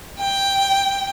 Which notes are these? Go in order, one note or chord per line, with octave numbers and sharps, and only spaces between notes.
G5